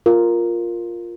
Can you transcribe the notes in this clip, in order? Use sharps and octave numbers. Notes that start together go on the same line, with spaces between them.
F4 A#4